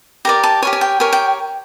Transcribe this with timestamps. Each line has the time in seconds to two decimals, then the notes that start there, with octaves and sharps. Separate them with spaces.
0.25 G4 A#4 D5 A#5
0.43 A5
0.62 G4 A#4 C#5 G#5
0.73 G#5
0.81 G5
1.00 G4 A#4 C#5 G#5
1.13 G5